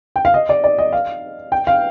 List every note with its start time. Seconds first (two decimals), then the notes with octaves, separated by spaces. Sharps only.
0.16 G5
0.25 F5
0.34 D#5
0.49 D5
0.64 D5
0.78 D#5
0.93 F5
1.52 G5
1.67 F5